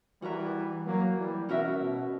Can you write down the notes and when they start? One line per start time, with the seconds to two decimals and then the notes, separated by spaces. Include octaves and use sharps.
0.22 E3 G3 F#4 A#4 E5 A#5
0.86 F#3 A#3
1.17 E3 G3
1.49 B2 C#4 F#4 A#4 E5
1.81 B2